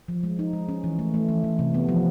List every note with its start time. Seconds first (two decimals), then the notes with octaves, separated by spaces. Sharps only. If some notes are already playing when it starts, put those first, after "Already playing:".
0.08 F3
0.23 G#3
0.39 D#4
0.53 G#3
0.69 C#4
0.84 E3
0.99 A3
1.14 A3
1.29 E3
1.44 E3
1.59 C3
1.74 B3
1.89 F3